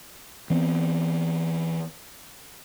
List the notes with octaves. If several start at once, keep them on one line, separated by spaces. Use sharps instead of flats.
E3 B3 C4